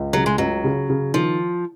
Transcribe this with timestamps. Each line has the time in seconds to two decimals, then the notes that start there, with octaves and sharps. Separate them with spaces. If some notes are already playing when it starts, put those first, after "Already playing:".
Already playing: C#2
0.13 C#3 F#3
0.26 G#3
0.38 C#2 F#3
0.64 C#3
0.90 C#3
1.13 D#3 F3